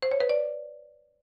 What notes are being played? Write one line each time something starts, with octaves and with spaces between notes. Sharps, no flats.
C5
C#5
B4
D5